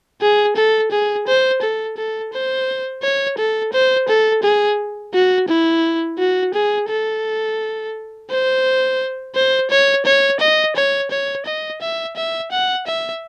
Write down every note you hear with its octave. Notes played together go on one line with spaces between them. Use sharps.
G#4
A4
G#4
C5
A4
A4
C5
C#5
A4
C5
A4
G#4
F#4
E4
F#4
G#4
A4
C5
C5
C#5
C#5
D#5
C#5
C#5
D#5
E5
E5
F#5
E5